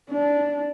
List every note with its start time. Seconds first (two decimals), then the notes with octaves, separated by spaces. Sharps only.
0.11 D4